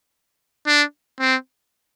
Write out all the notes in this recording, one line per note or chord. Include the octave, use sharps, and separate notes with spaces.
D4
C4